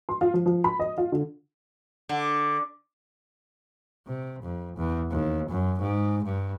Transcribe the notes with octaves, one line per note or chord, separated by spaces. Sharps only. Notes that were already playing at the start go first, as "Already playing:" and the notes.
C6
F4
F3
F3
B5
D#5
F4
D3
D3
C3
F2
E2
D#2
F#2
G#2
G2